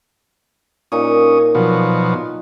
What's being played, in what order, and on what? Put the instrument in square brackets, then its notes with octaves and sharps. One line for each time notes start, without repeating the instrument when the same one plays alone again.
[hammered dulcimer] A#2 D#4 [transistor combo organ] C#4 D#6
[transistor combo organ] B2 F3 F#3